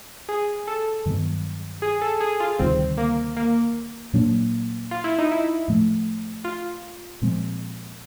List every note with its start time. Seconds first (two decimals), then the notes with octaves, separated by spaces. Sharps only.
0.29 G#4
0.67 A4
1.06 G2 D#3 F#3 B3
1.82 G#4
2.01 A4
2.20 G#4
2.40 F4
2.59 D2 C3 D#3 G3 C4
2.98 A#3
3.37 A#3
4.13 A#2 F#3 A#3 D4
4.91 F4
5.04 E4
5.18 D#4
5.32 E4
5.68 A2 F3 A3
6.44 F4
7.22 A#2 F3 G#3 C4